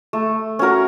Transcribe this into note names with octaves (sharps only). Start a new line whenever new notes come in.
A3
C#4 F#4 A#4